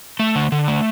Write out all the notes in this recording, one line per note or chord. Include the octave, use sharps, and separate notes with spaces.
A3
D3
D3
A3